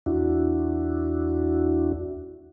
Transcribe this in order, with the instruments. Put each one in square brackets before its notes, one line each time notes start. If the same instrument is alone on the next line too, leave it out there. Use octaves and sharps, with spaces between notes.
[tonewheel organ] E2 D4 E4 F#4